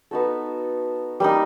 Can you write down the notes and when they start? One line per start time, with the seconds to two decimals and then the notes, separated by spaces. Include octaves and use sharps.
0.11 B3 D#4 F#4 A4
1.20 G3 A#3 D#4